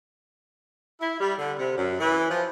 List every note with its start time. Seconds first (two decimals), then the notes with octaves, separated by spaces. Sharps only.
1.00 E4
1.21 G3
1.38 D3
1.58 C3
1.77 F#2
1.99 E3
2.30 F3